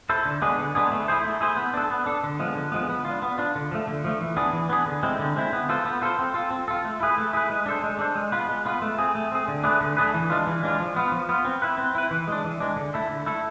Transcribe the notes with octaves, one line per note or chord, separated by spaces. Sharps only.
E4 A4 C5
D3
G#3 B3 D4 G#4
D3
G#3 B3 D4 G#4
A3
E4 G#4 C5
A3
E4 G#4 C5
B3
D4 A4
B3
D4 A4
D3
F3 G#3 B3
D3
F3 G#3 B3
B3
D4 F4
B3
D4 F4
D3
F3 A3
D3
F3 A3
E3
B3 D4 G#4
E3
B3 D4 G#4
D3
G#3 C4 E4
D3
G#3 C4 E4
B3
F4 A4 C5
B3
F4 A4 C5
C4
F4 A4
C4
F4 A4
A3
E4 G#4 B4
A3
E4 G#4 B4
G#3
D4 A4 C5
G#3
D4 A4 C5
G#3
B3 F4 B4
G#3
B3 F4 B4
A3
C4 G#4
A3
C4 G#4
D3
A3 D4 G#4 B4
D3
A3 D4 G#4 B4
E3
G#3 D4 F4
E3
G#3 D4 F4
F3
B3 F4
F3
B3 F4
C4
E4 B4
C4
E4 B4
E3
G#3 D4
E3
G#3 D4
D3
A3 E4 A4
D3
A3 E4 A4